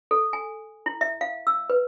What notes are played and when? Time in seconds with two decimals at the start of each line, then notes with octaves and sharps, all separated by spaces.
0.11 A4
0.33 G#5
0.86 E4
1.01 E5
1.21 F5
1.47 E6
1.70 B4